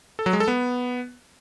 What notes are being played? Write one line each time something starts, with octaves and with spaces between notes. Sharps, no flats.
A4
F#3
G#3
A4
B3